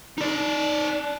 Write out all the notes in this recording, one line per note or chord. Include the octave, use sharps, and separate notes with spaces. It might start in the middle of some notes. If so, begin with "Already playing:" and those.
D#4 D5